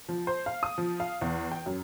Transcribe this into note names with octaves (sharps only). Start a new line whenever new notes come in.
F3
C5
F5
D#6
F3
F5
E2
G5
F#2